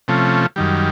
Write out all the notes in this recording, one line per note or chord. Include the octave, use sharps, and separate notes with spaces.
C3 F3 A3 C#4
F#2 D#3 G3